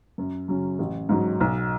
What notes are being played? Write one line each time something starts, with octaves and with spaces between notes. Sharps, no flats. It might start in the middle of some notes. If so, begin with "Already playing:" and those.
F#2
C#3 F#3 C#4
A1
G#2 F#3
B1